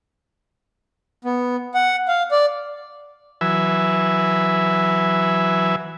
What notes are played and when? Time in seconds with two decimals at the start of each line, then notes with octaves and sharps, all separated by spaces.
1.25 B3
1.74 F#5
2.08 F5
2.31 D5
3.41 E3 F#3 B4 E5 G#5